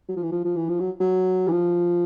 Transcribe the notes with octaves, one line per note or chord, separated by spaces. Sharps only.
F#3
F3
E3
F3
F3
E3
F3
F#3
F#3
E3
F3